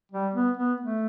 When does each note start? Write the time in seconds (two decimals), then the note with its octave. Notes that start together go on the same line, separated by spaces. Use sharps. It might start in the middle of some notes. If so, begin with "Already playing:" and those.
0.12 G3
0.34 B3
0.57 B3
0.80 A3